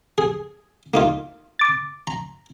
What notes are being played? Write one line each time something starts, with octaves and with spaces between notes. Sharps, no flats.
G#4
A#3 D#4 F4
D6 A6
A#5